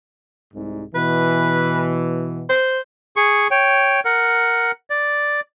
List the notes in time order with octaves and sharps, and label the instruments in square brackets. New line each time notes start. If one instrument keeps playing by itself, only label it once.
[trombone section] C2 G#2
[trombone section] B2 E3 [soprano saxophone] B4
[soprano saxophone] C5
[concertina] G#4 C#6
C#5 G5
A#4 F#5
D5